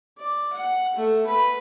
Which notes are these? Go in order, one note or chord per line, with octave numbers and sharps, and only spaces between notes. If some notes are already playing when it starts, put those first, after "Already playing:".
D5
F#5
A3
B4